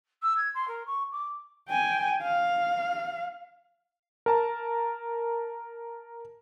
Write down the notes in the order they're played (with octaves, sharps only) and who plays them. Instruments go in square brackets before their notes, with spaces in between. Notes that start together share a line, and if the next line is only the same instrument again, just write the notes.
[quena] E6
G#6
C6
A#4
C#6
D6
[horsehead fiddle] G5 G#5
F5
[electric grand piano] A#4 A5 A#5